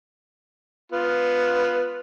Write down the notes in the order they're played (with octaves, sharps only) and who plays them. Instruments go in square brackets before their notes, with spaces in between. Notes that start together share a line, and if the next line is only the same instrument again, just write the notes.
[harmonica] B3 F4